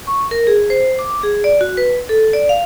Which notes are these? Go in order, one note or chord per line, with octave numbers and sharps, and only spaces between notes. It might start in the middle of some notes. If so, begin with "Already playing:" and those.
C#6
A#4
G#4
C5
D6
G#4
D5
F#4
B4
A4
D5
F5